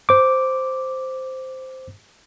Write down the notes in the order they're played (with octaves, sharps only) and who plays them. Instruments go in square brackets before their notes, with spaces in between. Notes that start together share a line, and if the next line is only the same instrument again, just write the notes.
[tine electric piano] C5 D6